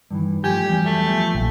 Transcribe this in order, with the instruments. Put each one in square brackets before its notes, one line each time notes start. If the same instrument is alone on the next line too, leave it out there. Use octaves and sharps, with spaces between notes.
[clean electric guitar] G2 D#3 E3
[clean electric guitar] F3 A3 [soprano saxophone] G4 [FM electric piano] G#5 G6
[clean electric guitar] E2 F#3 G3
[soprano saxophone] A3
[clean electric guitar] F3
[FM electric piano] A#1